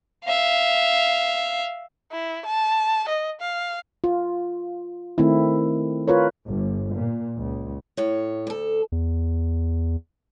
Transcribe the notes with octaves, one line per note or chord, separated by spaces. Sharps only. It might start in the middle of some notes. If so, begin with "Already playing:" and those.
E5 F5
E4
A5
D#5
F5
F4
D#3 A3 C4 E4
F4 A#4 B4 C#5
G1
A#2
C#2
A2 C#5
D2 A4
E2